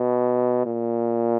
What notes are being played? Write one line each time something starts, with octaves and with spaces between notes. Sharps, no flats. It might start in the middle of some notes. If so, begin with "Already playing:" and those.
Already playing: B2
A#2